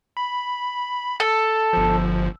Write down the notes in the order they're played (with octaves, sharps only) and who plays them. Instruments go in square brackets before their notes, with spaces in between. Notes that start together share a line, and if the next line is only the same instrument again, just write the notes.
[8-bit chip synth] B5
[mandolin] A4
[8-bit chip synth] G1 F3